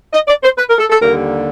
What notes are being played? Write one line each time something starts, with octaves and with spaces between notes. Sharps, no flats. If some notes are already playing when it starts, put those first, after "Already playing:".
D#5
D5
C5
B4
A#4
A4
A4
D#2 D3 G3 A#3 A#4